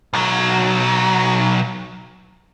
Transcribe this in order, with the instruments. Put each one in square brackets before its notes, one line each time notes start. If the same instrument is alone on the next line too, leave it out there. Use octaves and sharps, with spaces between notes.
[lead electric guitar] B1 F#3